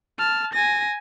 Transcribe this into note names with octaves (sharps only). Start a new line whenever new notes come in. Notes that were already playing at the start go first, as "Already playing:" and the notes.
A5 F6
G#5 A#6